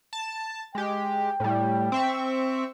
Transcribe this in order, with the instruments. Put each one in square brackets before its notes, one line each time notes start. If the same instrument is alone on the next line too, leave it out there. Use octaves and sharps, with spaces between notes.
[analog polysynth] A5
[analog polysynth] G#3 G4 [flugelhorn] G5
[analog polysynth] A2 G3
C4 E5 C#6